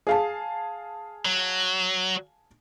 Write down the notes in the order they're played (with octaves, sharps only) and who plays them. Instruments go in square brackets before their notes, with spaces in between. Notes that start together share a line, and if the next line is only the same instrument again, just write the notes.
[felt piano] G#4 F5 A5
[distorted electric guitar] F#3